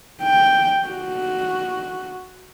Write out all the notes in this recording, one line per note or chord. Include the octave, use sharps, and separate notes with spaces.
G5
F#4